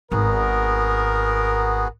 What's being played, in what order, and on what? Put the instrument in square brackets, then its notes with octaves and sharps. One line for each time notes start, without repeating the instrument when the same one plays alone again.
[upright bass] G#1 [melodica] B3 F#4 G#4 [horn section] A#4